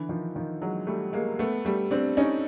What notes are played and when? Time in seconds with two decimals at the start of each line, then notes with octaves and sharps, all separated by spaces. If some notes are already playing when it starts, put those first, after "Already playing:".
Already playing: D3 E3
0.09 D#3 F3
0.35 D#3 F3
0.62 F#3 G#3
0.87 G3 A3
1.13 G#3 A#3
1.39 A3 B3
1.65 G3 A3
1.91 C4 D4
2.17 C#4 D#4